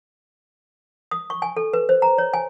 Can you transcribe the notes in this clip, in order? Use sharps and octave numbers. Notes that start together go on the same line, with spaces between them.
D#6
C#6
G#5
A4
B4
C5
A#5
C#5
G#5